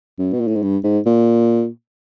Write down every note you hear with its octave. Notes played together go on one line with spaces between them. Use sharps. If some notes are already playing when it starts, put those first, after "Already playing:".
F#2
B2
A#2
A2
G#2
G2
G#2
A#2